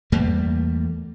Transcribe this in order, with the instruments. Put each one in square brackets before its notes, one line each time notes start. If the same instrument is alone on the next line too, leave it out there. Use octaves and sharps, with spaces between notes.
[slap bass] E2 G3 A3 A#3